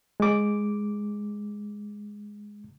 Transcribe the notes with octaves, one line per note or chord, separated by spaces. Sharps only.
G#3 D6